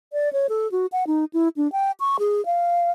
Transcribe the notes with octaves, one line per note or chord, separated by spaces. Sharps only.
D5
C#5
A4
F#4
F#5
D#4
E4
D4
G5
C#6
G#4
F5